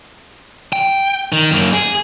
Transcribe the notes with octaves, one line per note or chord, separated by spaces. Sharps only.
G5
D#3
F#2 A#3
G#4